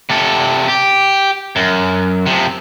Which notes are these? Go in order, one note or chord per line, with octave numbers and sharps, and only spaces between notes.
C3 A4
G4
F#2
C3 F3